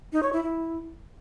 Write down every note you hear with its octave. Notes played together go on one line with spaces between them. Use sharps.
D#4
C#5
E4
E4